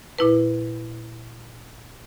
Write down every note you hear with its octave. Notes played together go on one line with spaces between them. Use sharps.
A#2 E4 B4